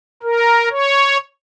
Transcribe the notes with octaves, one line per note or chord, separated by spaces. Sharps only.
A#4
C#5